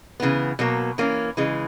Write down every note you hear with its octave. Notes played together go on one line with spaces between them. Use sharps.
C#3 E3 B3
B2 F#3 A#3
E3 A#3 C#4
C#3 E3 G#3